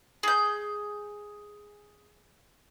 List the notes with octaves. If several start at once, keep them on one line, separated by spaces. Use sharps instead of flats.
G#4 G6